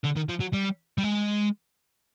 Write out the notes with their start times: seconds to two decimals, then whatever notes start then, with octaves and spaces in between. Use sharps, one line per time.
0.04 D3
0.16 D#3
0.29 F3
0.40 F#3
0.53 G3
0.98 G3
1.03 G#3